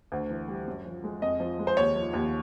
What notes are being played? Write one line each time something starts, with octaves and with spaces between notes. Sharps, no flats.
D2
E3
G3
F#2
F3
G#3
F2 D#5
F3
G#3
C5
D#2 C#5
F3
D#2